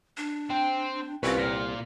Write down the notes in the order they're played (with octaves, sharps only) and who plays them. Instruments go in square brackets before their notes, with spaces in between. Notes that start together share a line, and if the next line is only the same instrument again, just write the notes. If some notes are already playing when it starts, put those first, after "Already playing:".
[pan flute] D4
[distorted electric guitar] C4 [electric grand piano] G5
[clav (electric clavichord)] C2 [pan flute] C4 [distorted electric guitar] C#4 [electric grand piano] F4 B4
[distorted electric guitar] A#2 F4 [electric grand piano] F6 A#6 B6